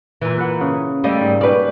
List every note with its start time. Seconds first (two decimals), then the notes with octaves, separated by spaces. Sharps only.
0.21 A#2 E3
0.38 B4 F#5
0.60 C#3
1.04 G3 A3 A#3 D#5
1.21 G#2
1.41 C#4 G4 B4 D5